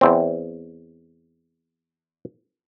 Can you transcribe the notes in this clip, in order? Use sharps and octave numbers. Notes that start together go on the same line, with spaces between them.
E2 C4